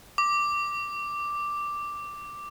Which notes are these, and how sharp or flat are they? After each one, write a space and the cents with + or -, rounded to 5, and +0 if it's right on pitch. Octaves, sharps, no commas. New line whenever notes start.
D6 +0